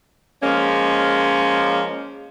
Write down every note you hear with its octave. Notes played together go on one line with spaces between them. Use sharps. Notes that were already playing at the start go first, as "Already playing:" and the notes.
F3 G#3 A#3 C#4